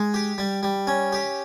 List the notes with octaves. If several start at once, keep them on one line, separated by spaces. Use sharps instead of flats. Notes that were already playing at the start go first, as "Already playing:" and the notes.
Already playing: G#3
G4
G3
G3
C#4
G4